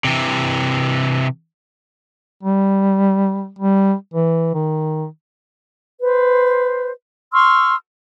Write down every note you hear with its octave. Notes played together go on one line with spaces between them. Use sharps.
C3 E3
G3
G3
E3
D#3
B4 C5
C6 C#6 E6 F6